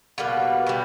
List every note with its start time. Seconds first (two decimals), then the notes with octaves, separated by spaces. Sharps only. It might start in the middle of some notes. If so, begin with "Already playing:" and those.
0.18 B2 G3 A#3 B4
0.67 B2 G3